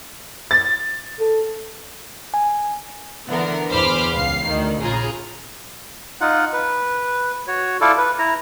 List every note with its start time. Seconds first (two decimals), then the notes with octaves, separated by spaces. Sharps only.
0.51 A6
1.20 A4
2.34 G#5
3.28 D3 E3 B3 A#4
3.70 E2 C5 B5 D6 F6
4.14 C#2 F5 C7
4.48 D2 D#3
4.80 A#1 C#3 F4 G#4 A#5
6.21 D#4 F4 F#5
6.53 B4
7.47 F#4 C#5
7.81 E4 F4 A4 D5
7.98 B4
8.19 E4 A#5